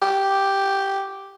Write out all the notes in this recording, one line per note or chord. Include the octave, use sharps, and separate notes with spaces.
G4